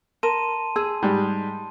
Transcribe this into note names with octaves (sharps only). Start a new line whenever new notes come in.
A#4 A5 C6 D#7
G#4 E6
G#2 G3 G#3